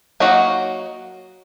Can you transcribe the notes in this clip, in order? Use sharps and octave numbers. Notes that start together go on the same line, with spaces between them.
F#3 A#3 D#4 F#4